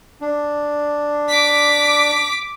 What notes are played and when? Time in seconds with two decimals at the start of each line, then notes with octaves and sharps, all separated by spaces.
0.21 D4
1.29 D6 B6